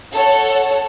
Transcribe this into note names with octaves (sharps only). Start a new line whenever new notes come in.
A4 C#5 F#5